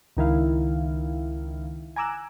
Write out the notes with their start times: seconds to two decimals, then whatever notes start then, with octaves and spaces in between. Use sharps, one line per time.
0.17 C#2 D#3 E4 F5
1.96 G#5 A#5 D6 E6 F#6